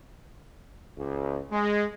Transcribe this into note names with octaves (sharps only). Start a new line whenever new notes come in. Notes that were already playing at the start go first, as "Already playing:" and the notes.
C#2
G#3